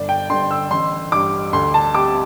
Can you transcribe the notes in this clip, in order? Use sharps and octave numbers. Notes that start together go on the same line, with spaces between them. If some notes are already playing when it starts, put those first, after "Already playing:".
Already playing: G1 D5
G5
G2 D3 C6
E6
A1 C6
G2 G3 D6
D2 C6
A5
C3 G3 D6